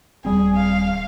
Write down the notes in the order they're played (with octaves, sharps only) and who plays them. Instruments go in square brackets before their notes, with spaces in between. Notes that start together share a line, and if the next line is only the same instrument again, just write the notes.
[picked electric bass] D#1 G3 C4 [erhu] G#4
[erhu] F5